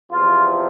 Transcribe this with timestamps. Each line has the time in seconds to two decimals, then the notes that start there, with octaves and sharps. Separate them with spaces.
0.11 E2 C3 F3 F4